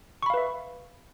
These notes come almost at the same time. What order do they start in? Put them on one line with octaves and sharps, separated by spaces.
C#6 B5 F5 B4 E5